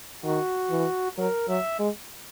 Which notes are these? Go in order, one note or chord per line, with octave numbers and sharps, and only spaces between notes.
D#3 F#4
E3
F#3 A#4
F#3 E5
G#3